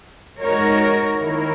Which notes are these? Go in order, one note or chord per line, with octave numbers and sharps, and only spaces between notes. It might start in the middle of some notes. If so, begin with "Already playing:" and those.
G#3 D#4 F#4 A#4 C#5
D#3 A#3 E4 A#4 C#5